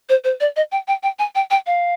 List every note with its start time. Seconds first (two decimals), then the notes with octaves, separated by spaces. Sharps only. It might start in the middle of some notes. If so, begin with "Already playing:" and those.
0.09 C5
0.24 C5
0.40 D5
0.56 D#5
0.72 G5
0.88 G5
1.03 G5
1.19 G#5
1.35 G5
1.51 G5
1.66 F5